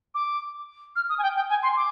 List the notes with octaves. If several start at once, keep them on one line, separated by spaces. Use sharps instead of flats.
D6
F6
D#6
G#5
G5
G5
G#5
C6
D6